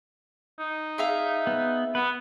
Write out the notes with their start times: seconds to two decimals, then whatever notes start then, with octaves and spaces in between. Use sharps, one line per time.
0.59 D#4
0.98 G#4 E5 F5
1.47 B3
1.95 B3 B4